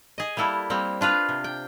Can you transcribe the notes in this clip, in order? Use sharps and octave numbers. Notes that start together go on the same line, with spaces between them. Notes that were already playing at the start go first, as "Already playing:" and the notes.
G#4 D#5
G3 A#3 E4 A4
G3 A#3 C4
D4 F4 B4 F5
C3
G5